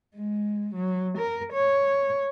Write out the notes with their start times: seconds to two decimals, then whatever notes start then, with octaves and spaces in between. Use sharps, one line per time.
0.15 G#3
0.75 F#3
1.18 A#4
1.53 C#5